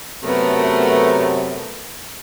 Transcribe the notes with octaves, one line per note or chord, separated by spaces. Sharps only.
F#2 C3 F#3 A3 B3 A#4